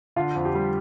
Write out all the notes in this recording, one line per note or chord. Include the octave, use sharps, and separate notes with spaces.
D3 F4
F2
G4
G3